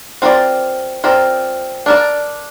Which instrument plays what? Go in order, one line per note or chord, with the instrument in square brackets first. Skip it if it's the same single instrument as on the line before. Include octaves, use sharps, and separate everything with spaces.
[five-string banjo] C4 F4 A#4 D5
C4 F4 A#4 D5
D4 A#4 D5